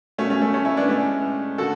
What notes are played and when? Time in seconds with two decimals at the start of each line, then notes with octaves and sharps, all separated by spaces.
0.18 B2 F#3 A3 C#4
0.30 A3 C#4
0.42 A3 C#4
0.54 A3 C#4
0.65 C#4 E4
0.77 B3 D4
0.89 A2 G#3 A3 C#4
1.58 D3 F#4 A4